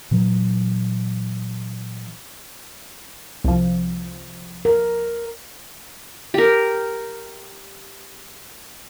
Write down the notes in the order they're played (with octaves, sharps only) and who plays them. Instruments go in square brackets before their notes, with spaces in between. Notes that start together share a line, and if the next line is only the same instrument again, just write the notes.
[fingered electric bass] A#2 E3 F#3
[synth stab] C2 F3
[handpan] A#4
[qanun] G4 A#4